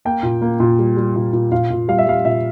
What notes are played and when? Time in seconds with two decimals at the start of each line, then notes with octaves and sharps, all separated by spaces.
0.05 A#3 G5
0.23 A#2
0.42 A#3
0.60 A#2
0.79 G3
0.96 G3
1.16 A#2
1.33 A#2
1.52 A#2 F5
1.70 A#2
1.88 G3 F5
1.98 E5
2.07 G3 F5
2.25 A#2 E5